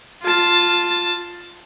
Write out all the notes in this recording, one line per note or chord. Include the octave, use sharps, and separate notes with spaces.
F4 A5